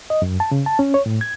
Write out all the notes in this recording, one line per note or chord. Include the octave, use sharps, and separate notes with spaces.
D#5
F#2
A5
C#3
A5
C#4
C#5
A2
G#6